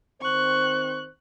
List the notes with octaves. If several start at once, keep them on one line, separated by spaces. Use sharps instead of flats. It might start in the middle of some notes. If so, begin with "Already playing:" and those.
D#3 C4 C5 C#6 F#6